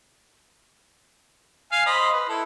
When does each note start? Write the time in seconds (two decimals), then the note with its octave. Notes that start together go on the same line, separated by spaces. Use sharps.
1.72 F5 G#5
1.86 C5 D#5 B5
2.13 B4
2.29 E4 A4